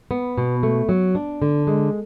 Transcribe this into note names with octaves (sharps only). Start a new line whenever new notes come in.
B3
B2
A3
F#3
D4
D3
G#3